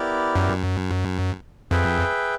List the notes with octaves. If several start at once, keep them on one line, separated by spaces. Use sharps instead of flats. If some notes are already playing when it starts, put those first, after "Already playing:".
Already playing: B3 E4 G4 A#4 D5
F#2
F2 G#4 B4 E5 G5